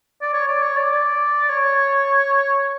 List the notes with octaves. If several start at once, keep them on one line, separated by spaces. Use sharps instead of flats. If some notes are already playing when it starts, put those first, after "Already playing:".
D5
C#5
D5
C#5
D5
D5
C#5